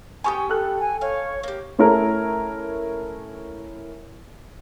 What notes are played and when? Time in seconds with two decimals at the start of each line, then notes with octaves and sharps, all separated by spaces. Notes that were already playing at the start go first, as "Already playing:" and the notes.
0.24 B3 G4 G5 G#5 C#6 D#6
0.49 A4 F#6
0.79 G#5
1.01 C#5 F5
1.43 A#3 G4
1.79 A3 C#4 E4 A4 A#4